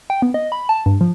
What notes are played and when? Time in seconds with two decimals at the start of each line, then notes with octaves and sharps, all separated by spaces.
0.10 G5
0.22 B3
0.34 D#5
0.52 B5
0.69 A5
0.86 G2
1.01 F3